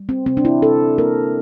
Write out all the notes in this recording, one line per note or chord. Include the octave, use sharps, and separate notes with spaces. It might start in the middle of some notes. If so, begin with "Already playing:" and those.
Already playing: G3
C4
C3 C4
D4
E4
C3 A4
A#3 A#4